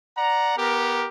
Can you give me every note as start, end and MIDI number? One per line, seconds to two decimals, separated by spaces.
0.18 0.56 74
0.18 0.56 78
0.18 0.56 82
0.57 1.09 59
0.57 1.09 67
0.57 1.09 70